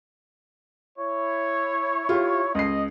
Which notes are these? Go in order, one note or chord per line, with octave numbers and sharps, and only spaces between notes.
E4 C#5
F4 G4
C#2 D#5 C7